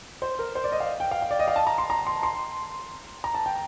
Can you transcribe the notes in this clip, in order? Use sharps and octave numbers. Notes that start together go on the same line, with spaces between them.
C5
A#4
C5
D5
D#5
F5
G5
F5
F5
D5
D#5
F5
A5
A#5
C6
A#5
C6
C6
A#5
A5
G5